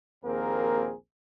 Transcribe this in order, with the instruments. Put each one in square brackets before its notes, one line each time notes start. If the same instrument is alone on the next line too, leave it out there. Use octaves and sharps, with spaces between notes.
[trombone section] A#1 D#2 A#3 C4 G#4 A#4